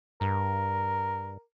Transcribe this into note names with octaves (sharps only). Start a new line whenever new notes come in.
G2 A#4